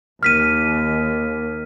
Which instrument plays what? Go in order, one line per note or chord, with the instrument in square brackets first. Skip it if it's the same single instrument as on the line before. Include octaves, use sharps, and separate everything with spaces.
[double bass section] D#2 [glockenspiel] F6 B6 D#7